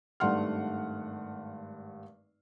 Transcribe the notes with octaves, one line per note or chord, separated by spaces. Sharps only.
G#1 G2 A3 F#5 C6 F6